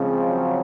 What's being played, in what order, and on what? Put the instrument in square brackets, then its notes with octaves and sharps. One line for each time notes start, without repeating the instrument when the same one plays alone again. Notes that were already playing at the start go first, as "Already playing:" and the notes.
Already playing: [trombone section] C#3 F3 G#3 C4
[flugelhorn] F#3